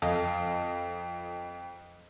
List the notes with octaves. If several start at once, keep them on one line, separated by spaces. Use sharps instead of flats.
F2 A4 D#5 F5